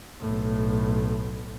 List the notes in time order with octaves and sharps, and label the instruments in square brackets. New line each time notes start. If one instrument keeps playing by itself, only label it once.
[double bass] B1 A2